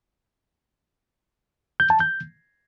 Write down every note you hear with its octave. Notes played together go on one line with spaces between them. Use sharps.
G6
A5
G6